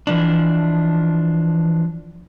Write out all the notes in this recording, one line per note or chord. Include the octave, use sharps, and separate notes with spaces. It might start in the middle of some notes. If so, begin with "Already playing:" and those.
E3 F3 D4